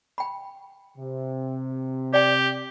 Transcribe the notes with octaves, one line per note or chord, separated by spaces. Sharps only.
G5 B5
C3
G4 D5 G5